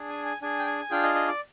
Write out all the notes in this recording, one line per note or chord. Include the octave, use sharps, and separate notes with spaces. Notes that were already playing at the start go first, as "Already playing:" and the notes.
Already playing: D4 G#4
G#5
G#5
D4 G#4 G#5
G5
G#5
D4 F4 G#4 G5
D#5
D#5
D5